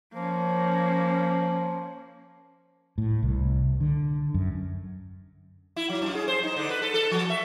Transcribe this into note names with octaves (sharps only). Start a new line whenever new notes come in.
F3 A#3 C#4
A2
C2
D3
F#2
E4
F#3
F#2
G#4
C5
D#4
D3
B4
A4
A4
F3
E5